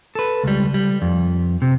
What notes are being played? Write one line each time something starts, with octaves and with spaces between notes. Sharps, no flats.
A4 B4
C#2 G3
G3
F2
C3